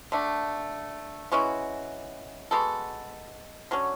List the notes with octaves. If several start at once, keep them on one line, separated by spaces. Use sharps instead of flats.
D3 A3 D4
E3 G#3 C#4 F#4
G#3 B3 F#4 A4
D3 F#3 C#4